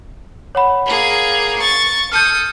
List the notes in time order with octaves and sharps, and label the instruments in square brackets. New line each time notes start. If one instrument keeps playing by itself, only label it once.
[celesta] C#5 F#5 B5
[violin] A#3 G#4
C#6 A6
[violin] A4 D#6 [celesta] F6 G6